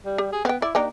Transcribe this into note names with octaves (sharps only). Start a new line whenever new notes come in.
G3
G4
G#4
B3 C4 G5
E4 D5
A#3 D4 D#4 G4